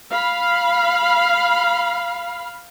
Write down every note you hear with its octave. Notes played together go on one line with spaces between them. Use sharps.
F5 B5